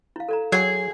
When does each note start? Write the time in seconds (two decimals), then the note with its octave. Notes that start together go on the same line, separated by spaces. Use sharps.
0.16 E4 F5
0.29 A4 D5 A#5
0.52 F#3 G#4